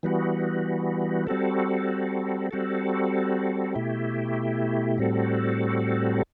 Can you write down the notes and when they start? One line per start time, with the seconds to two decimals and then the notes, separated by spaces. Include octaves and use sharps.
0.03 E3 G3 B3 F#4
1.27 G3 C4 F#4 A4
2.51 G3 C4 F#4 A4
3.75 B2 A3 E4 G4
4.98 A2 G3 C4 F#4 A4